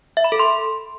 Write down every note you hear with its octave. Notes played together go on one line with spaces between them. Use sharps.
E5
B5
A4
C6